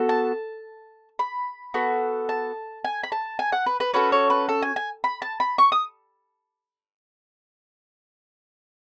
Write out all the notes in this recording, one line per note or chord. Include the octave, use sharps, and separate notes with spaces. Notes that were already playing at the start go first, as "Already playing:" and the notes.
Already playing: B3 F#4 A4
A5
B5
B3 F#4 A4
A5
G#5
B5
A5
G#5
F#5
B4
B4
C#4 F#4 A4 B4
C#5
B4
A4
G#5
G#5
B5
A5
B5
C#6
D#6